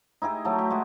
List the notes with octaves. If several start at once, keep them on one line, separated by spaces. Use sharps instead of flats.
D#4 E4 G4 G#4
F#3 A3
G4
G#3 F#4